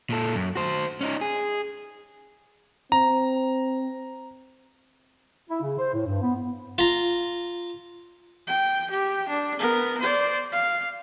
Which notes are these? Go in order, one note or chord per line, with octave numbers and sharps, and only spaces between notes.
A#2 A4
F#2
F#4 C5
C#4 D#4
G#4
C4 A#5
E4
C#3
C5
A2
G2
B3
F4 A#5
G5
G4
D4
B3 A#4
C5 D5
F5